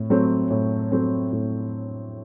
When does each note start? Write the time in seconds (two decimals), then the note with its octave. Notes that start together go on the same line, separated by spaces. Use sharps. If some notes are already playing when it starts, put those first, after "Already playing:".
Already playing: A2 C4
0.10 F#3 A3 C4
0.50 A2
0.92 F#3 A3 C4
1.32 A2